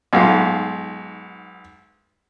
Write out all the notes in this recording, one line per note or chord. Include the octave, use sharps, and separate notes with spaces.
B1 G#2 F4